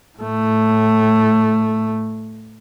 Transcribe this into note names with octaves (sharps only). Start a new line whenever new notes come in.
A2 A3